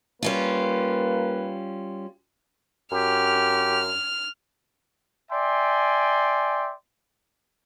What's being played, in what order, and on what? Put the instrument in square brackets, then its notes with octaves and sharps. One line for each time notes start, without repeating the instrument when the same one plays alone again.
[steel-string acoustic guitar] G3 C#4 F4 [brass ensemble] A#3 B4
[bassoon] F#2 [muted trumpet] G4 [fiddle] F6
[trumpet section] D5 E5 G5 G#5 C6